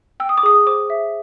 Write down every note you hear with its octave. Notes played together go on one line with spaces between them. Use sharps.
G5 E6
D#6
D6
G#4 D#6
C5 D6
E5